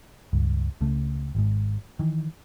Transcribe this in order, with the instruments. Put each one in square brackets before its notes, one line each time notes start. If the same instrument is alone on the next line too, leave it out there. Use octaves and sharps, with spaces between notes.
[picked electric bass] C#2 G2
C#2 C#3 A3
G#1 G#2
D#3 E3